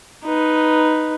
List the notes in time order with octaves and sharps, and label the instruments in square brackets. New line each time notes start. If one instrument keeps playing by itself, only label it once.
[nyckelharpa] D#4 B4